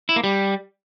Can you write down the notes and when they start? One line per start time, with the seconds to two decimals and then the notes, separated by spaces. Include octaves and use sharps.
0.09 E4
0.16 A#3
0.24 G3